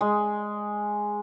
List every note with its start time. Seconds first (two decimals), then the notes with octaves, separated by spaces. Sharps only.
0.01 G#3